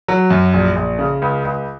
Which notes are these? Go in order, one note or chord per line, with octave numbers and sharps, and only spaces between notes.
F#3
F#2
A#1
A#1
C#3
C#2
C#2